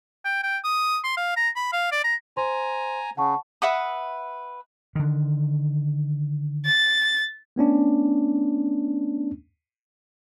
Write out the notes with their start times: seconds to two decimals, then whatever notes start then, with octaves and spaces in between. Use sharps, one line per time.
0.25 G5
0.43 G5
0.64 D#6
1.04 C6
1.17 F5
1.36 A#5
1.56 B5
1.73 F5
1.92 D5
2.04 A#5
2.37 C5 G#5 A#5 C6
3.17 C#3 F#5 A5 C#6
3.62 B4 E5 F#5 D#6
4.95 D3 D#3
6.65 A6
7.56 A3 B3 C#4 D4